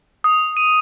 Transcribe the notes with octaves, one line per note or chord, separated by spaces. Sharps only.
D#6
D#7